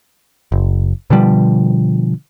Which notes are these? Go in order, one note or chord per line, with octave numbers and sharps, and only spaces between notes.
F#1
B2 D3 F3 G3